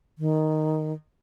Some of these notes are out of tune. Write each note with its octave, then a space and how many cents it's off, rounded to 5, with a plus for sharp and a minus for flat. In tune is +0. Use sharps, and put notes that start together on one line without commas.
D#3 +0